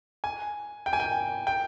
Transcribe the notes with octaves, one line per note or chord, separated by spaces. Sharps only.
G#5
G5
G#5
G5
G5